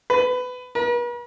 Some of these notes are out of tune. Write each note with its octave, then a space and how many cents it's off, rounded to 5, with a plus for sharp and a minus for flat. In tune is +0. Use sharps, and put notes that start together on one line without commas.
B4 +20
B4 -45